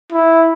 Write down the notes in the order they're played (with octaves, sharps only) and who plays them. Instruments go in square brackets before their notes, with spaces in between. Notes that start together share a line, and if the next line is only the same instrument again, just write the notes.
[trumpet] E4